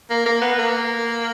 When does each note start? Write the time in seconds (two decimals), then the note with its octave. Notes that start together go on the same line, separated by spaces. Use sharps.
0.10 A#3
0.26 A#3
0.41 B3
0.58 A#3